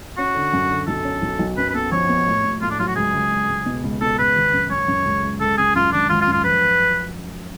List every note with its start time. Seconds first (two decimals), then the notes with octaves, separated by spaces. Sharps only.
0.18 C#4 F#4
0.35 D3
0.53 F#2
0.71 D3
0.87 B1 A4
1.05 C#4
1.22 B1
1.39 B1
1.57 F#2 B4
1.70 B4
1.74 B3 A4
1.92 F3 C#5
2.09 B3
2.27 A2
2.44 A2
2.62 A2 F4
2.70 D4
2.79 F#3 F4
2.88 F#4
2.96 C#2 G#4
3.14 C#2
3.31 G#3
3.49 C#2
3.66 B2
3.83 C#2
4.01 B2 A4
4.18 C#2 B4
4.36 G#1
4.53 F#2
4.70 F#2 C#5
4.88 F#2
5.05 C#2
5.22 C#2
5.40 C#2 A4
5.58 C#3 G#4
5.75 F#2 F4
5.92 G#1 D4
6.09 G#1 F4
6.21 F4
6.27 F#2
6.33 F4
6.44 F3 B4